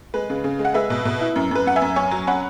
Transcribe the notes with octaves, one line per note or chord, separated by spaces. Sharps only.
G#3 B4
C#3
C#3
G#3
F#5
G#3 B4 E5
B2
B2
E4
F#2
F#2 B4
F#2 F#5
E5 G#5
F#2
C#4 G#5 C#6
F#3
C#4 F#5 B5